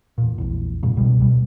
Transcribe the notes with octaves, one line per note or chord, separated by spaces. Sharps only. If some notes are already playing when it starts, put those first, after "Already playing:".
E2 A#2
A#1 E2
E2 G2 A#2 C#3
C#2 B2 G3
D#1 B2 G3